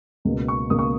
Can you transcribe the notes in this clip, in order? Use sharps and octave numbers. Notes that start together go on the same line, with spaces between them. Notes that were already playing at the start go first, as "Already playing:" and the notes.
C#2 B2 A#3
C#6
C#2 B2 A#3 D#6
C#6